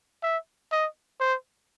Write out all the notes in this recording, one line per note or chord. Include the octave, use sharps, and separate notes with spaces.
E5
D#5
C5